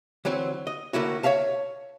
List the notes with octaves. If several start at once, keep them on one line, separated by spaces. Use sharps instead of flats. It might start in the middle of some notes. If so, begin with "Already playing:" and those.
D3 E3 F#3 C4
D#5
A2 D3 A#3 E4 F#4
C#5 D5 E5 F5 A5